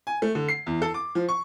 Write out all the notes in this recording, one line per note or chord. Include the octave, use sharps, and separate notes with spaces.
G#5
A3
D3
C7
E2
A4
D6
F3
C#6